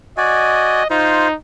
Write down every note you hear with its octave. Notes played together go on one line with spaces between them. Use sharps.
F#4 D5 D#5 G#5
D#4 F4 C5